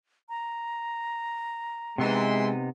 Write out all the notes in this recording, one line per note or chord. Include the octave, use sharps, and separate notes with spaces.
A#5
C3 E3 G#3 B3 D#4 E5 C6